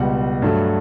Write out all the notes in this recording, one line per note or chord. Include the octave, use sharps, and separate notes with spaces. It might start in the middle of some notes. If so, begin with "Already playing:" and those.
Already playing: C#2 B2 G3 F#5
G2 F#3 A3